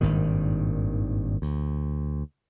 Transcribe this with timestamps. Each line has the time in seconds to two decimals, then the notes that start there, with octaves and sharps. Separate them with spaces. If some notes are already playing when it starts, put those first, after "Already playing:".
0.01 G#1 G2 A#2 D#3
1.42 D2